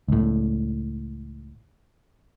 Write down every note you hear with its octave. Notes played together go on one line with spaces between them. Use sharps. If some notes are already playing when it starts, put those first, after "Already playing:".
C#2 A2